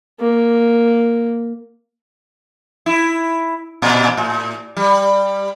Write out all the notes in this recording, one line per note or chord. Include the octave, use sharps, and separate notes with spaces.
A#3
E4
A#2
A2
G3